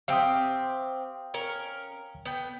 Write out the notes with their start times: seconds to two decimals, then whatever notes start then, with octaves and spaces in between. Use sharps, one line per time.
0.08 C4 G4 E5 F5 G5 D#6
1.34 C#4 A#4
2.26 B3 G5